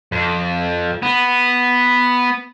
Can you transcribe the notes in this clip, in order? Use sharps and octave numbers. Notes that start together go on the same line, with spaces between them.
F2
B3